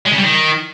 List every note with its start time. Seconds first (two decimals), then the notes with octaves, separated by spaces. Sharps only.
0.05 G#3
0.11 C#3
0.17 G3
0.23 D#3